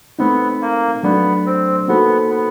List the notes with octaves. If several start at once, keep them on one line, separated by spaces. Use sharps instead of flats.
A3 B3 C4 D#4
A#3
F#3 A3 B3 D4
C4
A#3 B3 D#4 F#4 A4 C5
B3